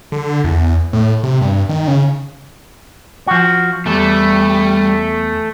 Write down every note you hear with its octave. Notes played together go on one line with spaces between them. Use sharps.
D3
E2
A2
C3
G2
D#3
C#3
F3 F#4
E2 G3 A3